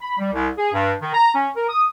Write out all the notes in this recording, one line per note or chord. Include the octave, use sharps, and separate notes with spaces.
B5
G3
C2
G#4
G2
D#3
A#5
C#4
A#4
D#6